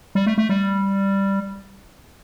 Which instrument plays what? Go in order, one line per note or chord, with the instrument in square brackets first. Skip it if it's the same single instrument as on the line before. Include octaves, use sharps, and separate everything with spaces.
[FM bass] G3
A3
A3
G3